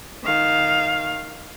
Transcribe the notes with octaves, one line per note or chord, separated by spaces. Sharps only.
D#3 F5